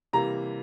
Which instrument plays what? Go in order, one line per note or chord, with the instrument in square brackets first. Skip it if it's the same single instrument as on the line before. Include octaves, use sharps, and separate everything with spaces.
[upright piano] C3 E3 G3 A#3 A#5